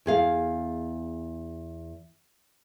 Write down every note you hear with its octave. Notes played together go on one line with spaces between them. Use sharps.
E2 G#4 F5